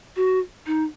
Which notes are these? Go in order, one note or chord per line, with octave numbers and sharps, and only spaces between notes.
F#4
D#4